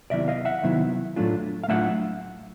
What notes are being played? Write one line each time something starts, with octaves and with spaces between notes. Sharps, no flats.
C3 D#3 F#3 B3 E4 D5 E5
D#5 F5
E5 F#5
C3 D#3 F#3 B3 E4
A2 F#3 A3 D4 F4
F5
A2 F#3 A3 D4 F4 E5 F#5